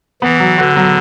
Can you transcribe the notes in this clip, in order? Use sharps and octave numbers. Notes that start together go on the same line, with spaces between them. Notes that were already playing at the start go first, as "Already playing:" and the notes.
E3 B3
F#3
D3 F#4
F#3